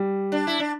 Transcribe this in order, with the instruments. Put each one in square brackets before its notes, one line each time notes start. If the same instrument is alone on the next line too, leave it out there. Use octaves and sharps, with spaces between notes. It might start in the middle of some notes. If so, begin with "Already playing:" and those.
Already playing: [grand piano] G3
[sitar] D4
E4
D4